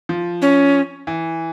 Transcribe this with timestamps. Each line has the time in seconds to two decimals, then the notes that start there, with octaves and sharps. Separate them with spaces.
0.09 F3
0.42 C#4
1.07 E3